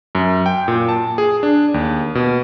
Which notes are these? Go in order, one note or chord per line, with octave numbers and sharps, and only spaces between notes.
F#2
G5
A#2
A5
G#4
D4
D#2
B2